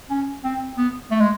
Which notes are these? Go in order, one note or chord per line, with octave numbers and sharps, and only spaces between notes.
C#4
C4
B3
A3
G#3